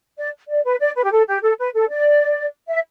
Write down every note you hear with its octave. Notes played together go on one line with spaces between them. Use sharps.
D5
D5
B4
D5
B4
G4
A4
G4
A4
B4
A4
D5
E5